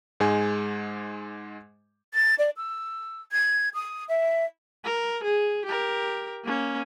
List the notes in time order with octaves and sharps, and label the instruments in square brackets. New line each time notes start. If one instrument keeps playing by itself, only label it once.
[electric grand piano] G#2 G#3 G#5
[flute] A6
D5
E6
G#6
D#6
E5
[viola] A#4
G#4
G4 A#4
A#3 C#4